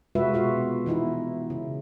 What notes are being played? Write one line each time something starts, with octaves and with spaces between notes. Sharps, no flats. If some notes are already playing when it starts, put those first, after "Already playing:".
C3 G#3 F4 F#4 B4 E5
B2 F4 F#4 F5
E3 B3 D#4 E4
C#3